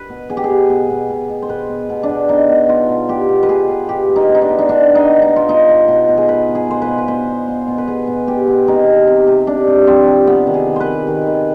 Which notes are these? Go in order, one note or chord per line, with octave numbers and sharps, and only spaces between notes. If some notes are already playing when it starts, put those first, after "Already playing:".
Already playing: B4
B2
B2 G#4
G4
G#4
B2
B2
B2
B2
B2
C5
B2 B4
B2
B2
D4
B2
B2 D#4
B2
B2 F4
B2
B2 G4
B2
B4
B2 G#4
B2
B2 G4
B2
D#4
B2
D#4
D4
B2
D#4
B2 D4
B2
D#4
B2
D#4
B2
F4
B2 D#4
B2
B2
B2
G#4
B2 B4
B2
G#4
B2 C5
B4
B2
B4
B2 C5
B2
B2
B2
B4
B2 G#4
B2
B2 G4
B2
C3 D#4
C3
C3
C3
C3 D4
C3
F3 C4
C3
C3 B3
D#3
G#4
D#3
B4 C5
C3
D#3
D#3